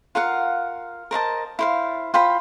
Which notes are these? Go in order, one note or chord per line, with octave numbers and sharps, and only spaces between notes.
F4 A#4 F5 F#5
A#4 C5 D#5 A5
E4 C5 F5
F4 C5 G5 B5